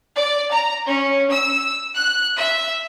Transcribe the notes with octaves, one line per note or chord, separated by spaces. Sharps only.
D5
A#5
C#4
E6
F#6
E5